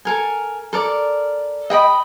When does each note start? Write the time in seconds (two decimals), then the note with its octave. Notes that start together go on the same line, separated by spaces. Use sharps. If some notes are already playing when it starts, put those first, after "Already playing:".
0.05 A4 A#4 G#5
0.73 A4 A#4 D5
1.70 D#5 G5 B5 D#6